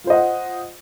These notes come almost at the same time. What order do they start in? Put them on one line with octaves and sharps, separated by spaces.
F4 C5 D#5 F#5